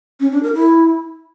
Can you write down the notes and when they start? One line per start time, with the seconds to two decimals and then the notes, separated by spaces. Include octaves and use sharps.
0.20 C#4
0.32 D4
0.43 A#4
0.54 E4